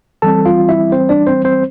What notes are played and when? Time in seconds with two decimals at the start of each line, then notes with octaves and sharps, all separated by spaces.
0.22 E3 G3 C4 A4 A5
0.46 F4 F5
0.69 E4 E5
0.92 C4 C5
1.09 D4 D5
1.27 C4 C5
1.44 C4 C5